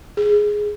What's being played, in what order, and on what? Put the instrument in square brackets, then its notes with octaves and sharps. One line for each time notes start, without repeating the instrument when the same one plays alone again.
[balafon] G#4